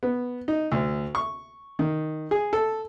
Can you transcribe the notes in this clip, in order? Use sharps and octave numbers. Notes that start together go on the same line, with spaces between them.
B3
D#4
D2
C#6
D#3
G#4
A4